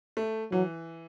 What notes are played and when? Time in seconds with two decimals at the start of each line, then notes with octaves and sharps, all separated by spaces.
0.17 A3
0.52 E3 F#3